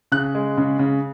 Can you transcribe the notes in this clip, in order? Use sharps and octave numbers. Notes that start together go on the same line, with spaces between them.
C#3 F#6
G#3
C#3
C#3